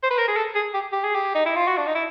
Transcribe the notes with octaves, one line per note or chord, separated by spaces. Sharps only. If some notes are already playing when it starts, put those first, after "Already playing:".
C5
B4
A#4
G#4
A4
G#4
G4
G4
G#4
G4
D#4
E4
F4
F#4
D4
D#4
E4